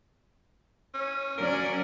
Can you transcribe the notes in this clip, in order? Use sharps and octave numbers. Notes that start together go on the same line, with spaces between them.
C#4
F#3 C#4 A#4 D5